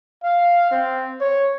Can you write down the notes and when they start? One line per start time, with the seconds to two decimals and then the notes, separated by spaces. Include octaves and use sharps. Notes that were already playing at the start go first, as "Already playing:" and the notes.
0.23 F5
0.71 C4
1.21 C#5